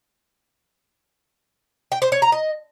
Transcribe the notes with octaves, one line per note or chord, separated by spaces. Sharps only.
G5
C5
C#5
A#5
D#5